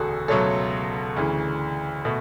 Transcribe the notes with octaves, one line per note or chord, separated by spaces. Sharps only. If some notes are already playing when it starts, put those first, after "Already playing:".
Already playing: E1 D2 C#3 F#4 G#4 A4
C#2 B2 F#3 A3 A4 C#5
D2 C#3 E3
B2 A3